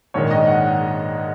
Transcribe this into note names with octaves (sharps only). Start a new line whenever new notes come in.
A#1 G#2 D#3 C#5
D#5
F#5